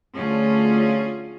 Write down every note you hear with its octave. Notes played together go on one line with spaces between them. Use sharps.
D2 C#4 F4 G#4